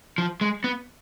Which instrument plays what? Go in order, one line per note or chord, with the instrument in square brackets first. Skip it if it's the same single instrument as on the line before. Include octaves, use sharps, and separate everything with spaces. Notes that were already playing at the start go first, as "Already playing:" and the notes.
[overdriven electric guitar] F3
G#3
B3